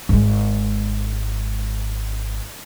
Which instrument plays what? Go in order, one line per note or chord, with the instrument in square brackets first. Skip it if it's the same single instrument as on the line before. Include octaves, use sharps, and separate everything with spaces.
[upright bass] G#1 G#3